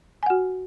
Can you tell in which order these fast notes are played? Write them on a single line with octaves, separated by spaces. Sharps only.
G#5 F#5 F#4